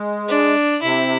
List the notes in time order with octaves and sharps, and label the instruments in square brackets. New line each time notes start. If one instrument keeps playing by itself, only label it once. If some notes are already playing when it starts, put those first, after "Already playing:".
Already playing: [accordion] G#3
[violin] D4
[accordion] C3 [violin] E4